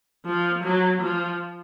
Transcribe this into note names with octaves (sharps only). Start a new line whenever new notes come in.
F3
F#3
F3